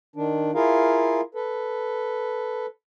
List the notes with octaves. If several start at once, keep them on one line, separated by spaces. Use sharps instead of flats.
D#3 D4
E4 F4 G#4 A#4 F5
A4 B4